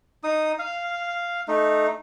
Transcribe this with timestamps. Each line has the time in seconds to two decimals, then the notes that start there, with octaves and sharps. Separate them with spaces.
0.24 D#4 D#6
0.59 F5
1.48 A3 D#4